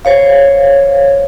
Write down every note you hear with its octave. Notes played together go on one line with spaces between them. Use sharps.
C5 C#5 F5